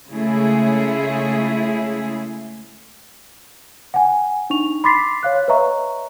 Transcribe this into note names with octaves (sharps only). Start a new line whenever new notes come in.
C#3 G#3 A3 E4 G#4
F#5 G#5
D4 D#4 C#6 F7
B5 C6 D6 A6 B6 C7
C#5 F5 F#6
B4 C#5 D#5 E5 A#5 C#6